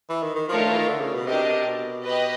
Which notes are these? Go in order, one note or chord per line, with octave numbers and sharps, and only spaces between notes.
E3
D#3
D#3
F3 A3 D4 F4 A#4 C#5
D#3
E3
D#3
D3
C#3
B2
C3 D4 G4 A#4 D#5
B2
G4 B4 D#5